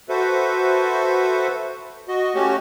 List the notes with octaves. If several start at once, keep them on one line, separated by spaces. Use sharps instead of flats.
F#4 A4 B4 C5 E5
F#4 D#5
A3 C#4 F#4 G4